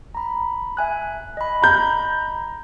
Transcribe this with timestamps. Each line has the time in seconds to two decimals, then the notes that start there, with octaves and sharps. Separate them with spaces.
0.15 A#5 B5
0.77 E5 G#5 F#6
1.37 D#5 B5
1.62 A#5 G6